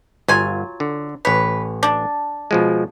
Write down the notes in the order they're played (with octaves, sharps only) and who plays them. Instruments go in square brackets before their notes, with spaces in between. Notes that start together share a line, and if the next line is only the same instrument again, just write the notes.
[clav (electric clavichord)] G1 [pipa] F#3 F4 G#5
[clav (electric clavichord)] D3
[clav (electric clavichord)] A1 C#5 [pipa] B4
[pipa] D4
[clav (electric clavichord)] B2 F3 G#3